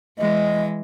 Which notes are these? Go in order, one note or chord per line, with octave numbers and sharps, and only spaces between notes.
E3 G#3 D#5